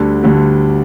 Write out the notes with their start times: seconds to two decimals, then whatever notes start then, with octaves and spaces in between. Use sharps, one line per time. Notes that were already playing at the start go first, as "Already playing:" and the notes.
Already playing: D2 D3 G3
0.23 D2 D3 G3